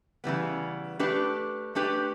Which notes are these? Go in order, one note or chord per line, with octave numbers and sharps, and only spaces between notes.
C#3 E3 G3 B3
A3 D4 G4 B4
A3 D4 G4 B4